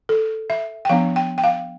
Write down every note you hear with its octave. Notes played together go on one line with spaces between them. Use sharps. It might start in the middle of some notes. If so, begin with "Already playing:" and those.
A4
E5
G5
F3 B3 D4 F5
G5
G5
F5